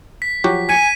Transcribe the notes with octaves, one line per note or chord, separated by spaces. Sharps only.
B6
F3 F#3 F#4 G4
G#5 G#6 B6 C#7 D#7